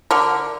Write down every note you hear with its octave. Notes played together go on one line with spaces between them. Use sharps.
D3 A#4